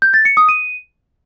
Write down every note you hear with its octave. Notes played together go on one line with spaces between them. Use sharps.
G6
A6
C#7
D#6
D#7